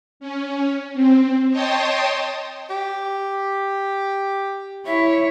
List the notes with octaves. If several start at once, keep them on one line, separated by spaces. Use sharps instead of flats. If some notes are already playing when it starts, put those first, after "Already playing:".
C#4
C4
C#5 D#5 G5 A5 C6 D#6
G4
E4 C#5 E5